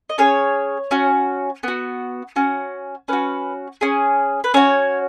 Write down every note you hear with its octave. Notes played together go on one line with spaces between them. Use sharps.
D#5
C#4 G#4 C#5
C#4 F#4
B3 F#4
C#4 F#4
C#4 F#4 B4
C#4 G#4
B4
C#4 F#4 C#5